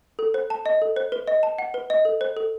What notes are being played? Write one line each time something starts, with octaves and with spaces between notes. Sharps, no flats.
A4
C5
A5
D#5
A4
C5
B4
D#5
A5
F#5
B4
D#5
A4
C5
A4